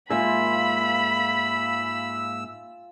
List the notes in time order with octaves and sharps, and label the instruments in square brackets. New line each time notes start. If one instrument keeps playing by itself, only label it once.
[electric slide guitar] G#2 A#3 [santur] F4 E5 G#5 [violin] B5 [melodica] E6